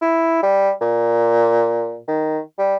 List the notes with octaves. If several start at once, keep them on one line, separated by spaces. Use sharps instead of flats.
E4
G3
A#2
D#3
G3